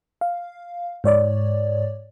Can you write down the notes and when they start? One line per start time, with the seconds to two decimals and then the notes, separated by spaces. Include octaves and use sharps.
0.21 F5
1.04 G#2 C#5 D5